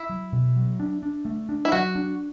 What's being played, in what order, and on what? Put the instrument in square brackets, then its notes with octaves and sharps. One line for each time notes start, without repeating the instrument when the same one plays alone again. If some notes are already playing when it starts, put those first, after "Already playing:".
Already playing: [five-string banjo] E4
[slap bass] F#3
B2
F#3
D4
D4
A3
D4
[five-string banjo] E4
[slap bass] F#3 [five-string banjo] F#4
[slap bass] D4